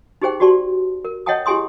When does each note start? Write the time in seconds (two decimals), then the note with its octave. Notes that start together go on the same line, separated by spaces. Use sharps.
0.22 D#4 G4 G#4 C5 G5
0.40 F#4 G4 D5 A5 C6
1.05 A#4
1.26 C#5 D#5 F#5 G5 A5 D#6
1.46 E4 G4 G#4 G#5 C6 D#6